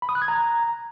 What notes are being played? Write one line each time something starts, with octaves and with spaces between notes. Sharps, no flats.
B5
D#6
F#6
G#6
A#5